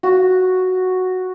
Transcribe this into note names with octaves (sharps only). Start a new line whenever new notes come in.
F#4